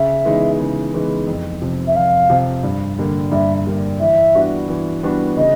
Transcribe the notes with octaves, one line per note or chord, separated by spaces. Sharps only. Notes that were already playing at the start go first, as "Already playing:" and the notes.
Already playing: C#3 E5
E3 G#3 B3 D#4
C#3
E3 G#3 B3 D#4
F2
C3 F3
E5
F2 F5
C3 F3
G2
D3 G3 A#3
G2 E5
D3 G3 A#3
E3 E5
G3 B3 D4 F#4
E3
G3 B3 D4 F#4
C#3 D#5